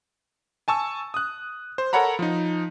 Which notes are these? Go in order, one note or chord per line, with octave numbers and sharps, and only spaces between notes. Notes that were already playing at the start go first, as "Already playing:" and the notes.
G#5 A5 C#6 E6
D#6 F#6
C5
A4 A#4 C#5 F#5 A#5 B5
F3 D#4